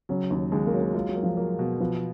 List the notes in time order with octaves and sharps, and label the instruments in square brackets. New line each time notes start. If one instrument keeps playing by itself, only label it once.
[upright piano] C#3 [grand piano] F#3
[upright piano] D#2
[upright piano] D#2 [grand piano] G#3
[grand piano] A#3
[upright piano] F#3
[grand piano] A#3
[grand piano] G#3 [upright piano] F4
[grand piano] F#3
[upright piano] A#3
[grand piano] F3
[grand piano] F#3 [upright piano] A#3
[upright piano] B2
[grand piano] F3 [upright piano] B3